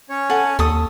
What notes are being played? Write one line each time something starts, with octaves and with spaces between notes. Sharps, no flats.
C#4 C#5
A4 F#5 G#5
D#2 A4 D#6